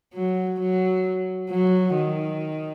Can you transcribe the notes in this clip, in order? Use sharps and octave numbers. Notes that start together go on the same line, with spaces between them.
F#3
F#3
F#3
D#3